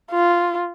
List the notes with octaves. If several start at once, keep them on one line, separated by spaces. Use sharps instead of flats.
F4